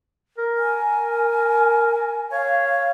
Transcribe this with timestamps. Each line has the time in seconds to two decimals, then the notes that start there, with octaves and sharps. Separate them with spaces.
0.38 A#4
0.57 G#5
2.32 C#5 F5